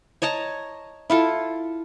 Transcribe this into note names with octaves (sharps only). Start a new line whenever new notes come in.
C#5 D#5 A5 A#5
E4 F4 A4